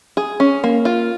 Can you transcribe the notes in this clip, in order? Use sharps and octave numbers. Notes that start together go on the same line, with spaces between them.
G#4
C#4
A#3
F4